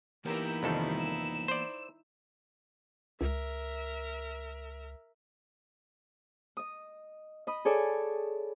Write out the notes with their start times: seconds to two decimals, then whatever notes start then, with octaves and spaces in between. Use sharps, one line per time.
0.25 E3 A#3 B3 D#4 E4 G4 A#4 E6
0.63 C2 F2 D#3 G3 A4
0.99 E6
1.48 C5 D5
3.21 C#2 A#4 E5
6.57 D#5 D#6
7.47 D#5 B5 D#6
7.65 G#4 A4 C#5 D5 G#5 A5